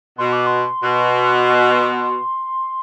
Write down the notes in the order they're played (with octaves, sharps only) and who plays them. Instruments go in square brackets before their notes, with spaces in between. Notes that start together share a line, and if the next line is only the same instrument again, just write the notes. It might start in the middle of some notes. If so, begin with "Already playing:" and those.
[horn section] B2 [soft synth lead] C6
[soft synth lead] D6
C6
[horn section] B2